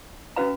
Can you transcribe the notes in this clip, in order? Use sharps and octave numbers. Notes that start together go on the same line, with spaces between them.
C#4 F#4 B4 F5 A#5